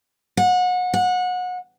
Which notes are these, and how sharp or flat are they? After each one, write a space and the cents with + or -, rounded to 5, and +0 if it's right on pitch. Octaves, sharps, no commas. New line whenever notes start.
F#5 -30
F#5 -25